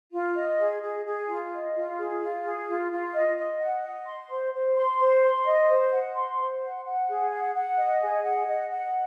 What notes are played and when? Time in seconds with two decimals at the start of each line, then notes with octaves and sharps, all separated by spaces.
0.12 F4
0.35 D#5
0.58 G#4
0.82 G#4
1.05 G#4
1.28 F4
1.52 D#5
1.74 F4
1.97 G#4
2.21 F4
2.44 G#4
2.68 F4
2.91 F4
3.14 D#5
3.37 D#5
3.60 F#5
3.84 D#5
4.06 C6
4.29 C5
4.53 C5
4.76 C6
5.00 C5
5.23 C6
5.46 D#5
5.69 C5
5.92 F#5
6.15 C6
6.39 C5
6.62 F#5
6.85 F#5
7.08 G#4
7.32 F#5
7.54 F#5
7.77 D#5
8.01 G#4
8.24 F#5
8.47 D#5
8.71 F#5